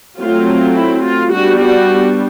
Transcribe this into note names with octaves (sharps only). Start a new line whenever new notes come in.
F#3 A3 C4 F4
E4
F4
G3 B3 D4 F#4
F#4